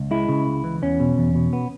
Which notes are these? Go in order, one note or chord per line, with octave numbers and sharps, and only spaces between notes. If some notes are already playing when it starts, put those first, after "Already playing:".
Already playing: C#2
G#3 E4
C#3
C#2
E3
E2 C#4
B2
E2
B2
B3